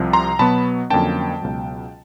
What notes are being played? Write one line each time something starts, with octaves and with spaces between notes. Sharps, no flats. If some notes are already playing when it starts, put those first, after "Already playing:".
Already playing: C2 C3 F3
A#5 C6
B2 F#3 B3 A5 B5
F2 D3 F#3 A#3 C#4 G5 A5
C#2 B2 F#3